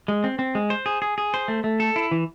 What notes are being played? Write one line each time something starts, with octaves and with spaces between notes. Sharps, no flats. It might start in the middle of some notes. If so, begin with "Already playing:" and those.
G#3
C4
C4
G#3
C5
G#4
G#4
G#4
C5
A3
A3
A4
E4
E3